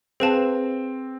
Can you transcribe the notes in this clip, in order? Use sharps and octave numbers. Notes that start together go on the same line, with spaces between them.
C4 G#4 B4 F5 A5